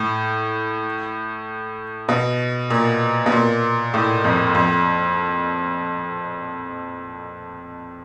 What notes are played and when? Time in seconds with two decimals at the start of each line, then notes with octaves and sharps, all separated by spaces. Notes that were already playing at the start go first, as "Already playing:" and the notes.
Already playing: A2
2.09 B2
2.70 A#2
3.26 B2
3.32 A#2
3.94 A2
4.24 F2
4.55 F2